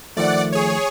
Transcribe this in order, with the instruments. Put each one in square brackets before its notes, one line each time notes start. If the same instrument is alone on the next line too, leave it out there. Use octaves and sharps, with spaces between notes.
[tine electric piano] D#3 F3 A3 [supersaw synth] D5 F#5
[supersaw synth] G#4 C#5